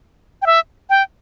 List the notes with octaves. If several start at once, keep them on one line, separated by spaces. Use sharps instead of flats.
G5
E5
G5